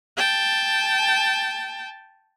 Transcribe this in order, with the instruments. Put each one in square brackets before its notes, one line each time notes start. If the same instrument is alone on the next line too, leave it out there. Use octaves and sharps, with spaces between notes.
[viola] G5 A5